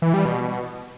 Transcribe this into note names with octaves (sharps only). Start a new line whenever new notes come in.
E3
G3
B2